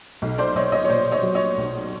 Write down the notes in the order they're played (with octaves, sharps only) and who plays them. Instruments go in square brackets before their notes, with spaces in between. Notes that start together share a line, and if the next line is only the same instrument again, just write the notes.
[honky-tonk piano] B1
C5 D5
B1 C#5 D#5
C#5 D#5
C#5
A#2 C5 D5
C#5 D#5
F#3
C#5 D#5
B1